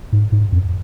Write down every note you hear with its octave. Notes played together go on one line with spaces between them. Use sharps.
G#2
G#2
F2